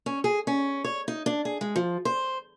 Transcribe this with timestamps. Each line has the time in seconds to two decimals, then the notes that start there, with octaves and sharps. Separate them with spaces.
0.06 C#4
0.24 G#4
0.47 C#4
0.84 C#5
1.08 D#4
1.26 D4
1.45 G#4
1.61 G#3
1.76 F3
2.05 C5